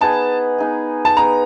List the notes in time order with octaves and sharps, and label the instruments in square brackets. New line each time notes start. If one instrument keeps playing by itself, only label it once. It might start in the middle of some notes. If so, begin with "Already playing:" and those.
[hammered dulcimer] B3 D#4 G#4 [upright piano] A5
[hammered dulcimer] B3 D#4 G#4
[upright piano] A5
[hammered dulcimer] B3 D#4 G#4 [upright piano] A#5